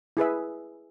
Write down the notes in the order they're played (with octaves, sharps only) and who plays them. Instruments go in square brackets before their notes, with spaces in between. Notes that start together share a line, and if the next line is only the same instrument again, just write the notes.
[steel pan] E4 G#4 B4 E5